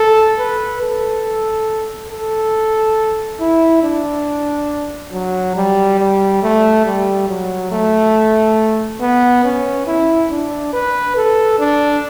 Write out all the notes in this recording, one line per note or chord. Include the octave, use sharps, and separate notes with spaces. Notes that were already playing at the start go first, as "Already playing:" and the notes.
Already playing: A4
B4
A4
A4
E4
D4
F#3
G3
G3
A3
G3
F#3
A3
B3
C#4
E4
D4
B4
A4
D4